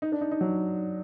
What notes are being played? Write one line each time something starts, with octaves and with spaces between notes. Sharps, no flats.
D#4
D4
D#4
D#4
F#3